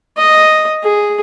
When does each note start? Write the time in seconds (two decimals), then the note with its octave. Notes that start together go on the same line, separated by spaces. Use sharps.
0.18 D#5
0.84 G#4